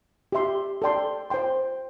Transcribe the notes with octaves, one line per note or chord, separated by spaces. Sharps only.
G4 E5 C6
A4 D5 G5 C6
C5 G5 C6